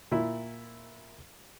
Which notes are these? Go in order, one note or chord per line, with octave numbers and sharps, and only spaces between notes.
A#2 E4